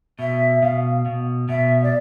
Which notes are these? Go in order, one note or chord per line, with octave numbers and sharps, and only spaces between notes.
B2 E5
B2 F5
B2
B2 E5
D5